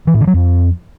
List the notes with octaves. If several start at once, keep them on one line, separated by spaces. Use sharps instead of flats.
E3
A2
D3
F#3
F2